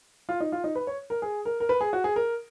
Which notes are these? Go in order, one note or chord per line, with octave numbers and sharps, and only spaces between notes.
F4
D#4
F4
D#4
B4
C#5
A#4
G#4
A#4
A#4
B4
G#4
F#4
G#4
A#4